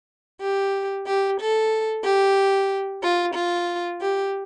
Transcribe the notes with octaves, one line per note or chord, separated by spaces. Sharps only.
G4
G4
A4
G4
F4
F4
G4